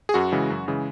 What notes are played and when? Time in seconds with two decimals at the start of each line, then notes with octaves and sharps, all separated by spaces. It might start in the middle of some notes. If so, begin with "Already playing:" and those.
0.09 G#4
0.14 F#2 F#4
0.32 C#3 E3 G#3
0.50 F#2
0.68 C#3 E3 G#3